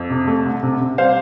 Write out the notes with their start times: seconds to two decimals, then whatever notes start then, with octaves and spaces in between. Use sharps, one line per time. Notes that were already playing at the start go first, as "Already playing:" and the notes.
Already playing: F2
0.10 C3
0.27 A3
0.45 C2
0.63 C3
0.80 C3
0.98 G3 C5 F5